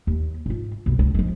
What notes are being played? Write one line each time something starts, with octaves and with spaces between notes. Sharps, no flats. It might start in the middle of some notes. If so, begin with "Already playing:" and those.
D#2
G#2 F4
B1 G2
C#2
F3 G#3